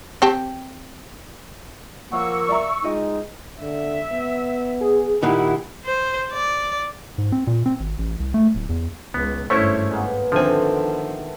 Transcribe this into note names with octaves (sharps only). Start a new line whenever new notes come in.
C4 G4 A5
F3 A#3 C#5 F5 F#5 C#6 E6
D5 E5 A#5
G#3 D#4 F4 D#5 G5
D3 E5
B3
G#4
A#2 D#3 E4 G4 F#5
C5
D5
G#2
C4
A#2
C4
G#1
A1
C2
A3
D1
E2
C#2 B3
G#1 G2 A3 C#4 E4 C5 C#5 C#6
G#3 A#3 B3
D3 D#3 F3 C4 A4 E5 G5 G#5